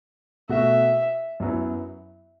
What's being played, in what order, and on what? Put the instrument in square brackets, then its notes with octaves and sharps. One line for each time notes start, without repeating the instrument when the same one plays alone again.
[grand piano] B2 A3 F#4 [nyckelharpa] E5
[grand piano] F#2 F#3 B3 E4